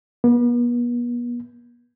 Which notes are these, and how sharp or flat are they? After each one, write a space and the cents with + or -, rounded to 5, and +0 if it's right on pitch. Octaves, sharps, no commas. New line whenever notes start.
B3 -40